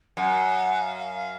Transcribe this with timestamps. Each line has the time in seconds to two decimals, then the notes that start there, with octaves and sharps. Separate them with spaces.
0.17 F#2 F#5
0.82 F5
0.99 F5
1.15 F5